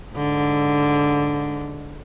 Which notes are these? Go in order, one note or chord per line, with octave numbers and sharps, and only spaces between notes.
G#2 D3